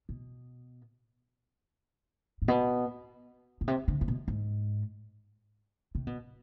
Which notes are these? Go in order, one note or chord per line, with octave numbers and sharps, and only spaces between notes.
B2
G#2
B2
B2
C3
D3
C3
B2
G#2
C3
B2